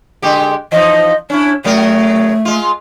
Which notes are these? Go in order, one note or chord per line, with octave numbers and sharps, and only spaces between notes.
D3 G#3 G4
E3 F3 D#4 D#5
C#4 D4 E4
C#3 F#3 A3 A#4
G#3 F4